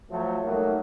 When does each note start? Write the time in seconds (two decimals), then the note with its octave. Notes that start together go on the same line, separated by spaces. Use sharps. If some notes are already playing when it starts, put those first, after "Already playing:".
0.10 F3 F#3 A3
0.44 F#3 G3 A3 A#3 D#4 F#4